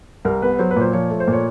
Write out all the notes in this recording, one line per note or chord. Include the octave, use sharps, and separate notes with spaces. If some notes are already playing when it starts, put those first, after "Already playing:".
C2 A#4
B3 B4
F#3 C5
B4
A#2 C5
F3 C#5
A3
C5
A#2
C#5